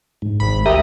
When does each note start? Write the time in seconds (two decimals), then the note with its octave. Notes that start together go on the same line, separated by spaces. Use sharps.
0.22 G#2
0.40 G#1 B5
0.66 D2 G4 A#4 E5 D#6